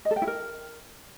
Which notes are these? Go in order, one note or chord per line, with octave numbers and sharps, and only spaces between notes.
D#5
A4
G5
E4
A#4